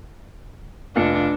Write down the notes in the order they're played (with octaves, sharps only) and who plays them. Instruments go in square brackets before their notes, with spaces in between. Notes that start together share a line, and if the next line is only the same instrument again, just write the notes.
[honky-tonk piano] F1 F4 C#7 [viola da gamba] D4